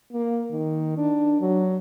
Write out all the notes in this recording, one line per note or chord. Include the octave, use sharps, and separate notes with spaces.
A#3
D#3
D4
F#3